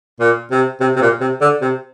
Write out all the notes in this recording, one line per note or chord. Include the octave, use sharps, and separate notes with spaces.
A#2
C3
C3
C3
A#2
C3
D3
C3